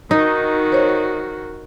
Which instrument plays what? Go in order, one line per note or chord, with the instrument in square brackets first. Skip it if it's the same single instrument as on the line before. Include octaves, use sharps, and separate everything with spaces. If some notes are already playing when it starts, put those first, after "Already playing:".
[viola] D#3 F#4 [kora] D#4
[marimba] C5 C#5